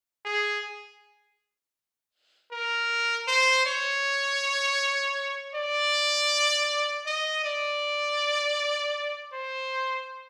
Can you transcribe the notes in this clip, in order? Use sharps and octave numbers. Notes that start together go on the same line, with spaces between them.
G#4
A#4
C5
C#5
D5
D#5
D5
C5